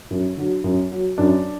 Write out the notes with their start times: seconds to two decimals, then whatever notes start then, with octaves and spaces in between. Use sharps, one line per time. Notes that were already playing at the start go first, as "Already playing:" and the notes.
0.11 F#2
0.37 D3 F#3
0.64 F#2
0.92 F#3
1.18 F#2 D4